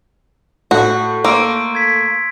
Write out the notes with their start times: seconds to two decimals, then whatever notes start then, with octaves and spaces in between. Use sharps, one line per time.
0.71 A2 F#4
1.24 A#3 C6 E6 D7
1.75 G#6 B6